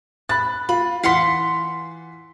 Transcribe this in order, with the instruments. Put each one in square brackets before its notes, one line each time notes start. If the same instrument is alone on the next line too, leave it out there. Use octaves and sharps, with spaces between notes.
[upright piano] B5 A6 [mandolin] F#6
[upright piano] F4 [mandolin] B5
[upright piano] E3 B6 [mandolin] F5 F#5 C6